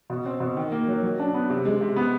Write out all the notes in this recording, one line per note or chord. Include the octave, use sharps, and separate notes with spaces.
B2
C4
B2
D#3
A#3
F#3
F#3
D4
B3
C3
G#3
C3
B3